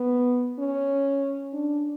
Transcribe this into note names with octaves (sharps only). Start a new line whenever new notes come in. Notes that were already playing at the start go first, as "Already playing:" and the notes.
Already playing: B3
C#4
D4